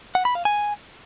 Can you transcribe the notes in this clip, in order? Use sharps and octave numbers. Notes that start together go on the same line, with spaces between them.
F#5
B5
F5
G#5